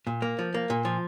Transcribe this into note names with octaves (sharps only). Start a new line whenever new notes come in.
A#2
A#3
F3
A#3
A#2
F3